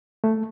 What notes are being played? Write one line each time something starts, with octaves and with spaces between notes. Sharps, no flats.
A3